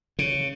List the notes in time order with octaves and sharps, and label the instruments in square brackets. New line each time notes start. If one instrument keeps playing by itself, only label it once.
[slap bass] C#3